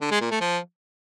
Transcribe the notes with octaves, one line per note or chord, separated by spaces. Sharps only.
D3
G#3
A#2
A3
F3